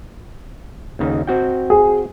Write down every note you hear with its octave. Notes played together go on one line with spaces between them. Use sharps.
D#2 C#3 D#4
C4 F#4 G5
G#4